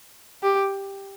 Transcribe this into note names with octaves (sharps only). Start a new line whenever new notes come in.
G4